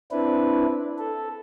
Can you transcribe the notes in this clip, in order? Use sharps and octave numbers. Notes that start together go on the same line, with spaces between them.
C4 D4 E4 B4
A4